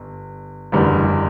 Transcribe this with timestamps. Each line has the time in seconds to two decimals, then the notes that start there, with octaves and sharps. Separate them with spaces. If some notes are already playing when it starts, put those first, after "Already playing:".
Already playing: G1
0.72 F#1 E2 D3 G3